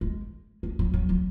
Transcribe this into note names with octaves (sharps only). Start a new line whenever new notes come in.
G#3
G#3
F#3
F#3
F#3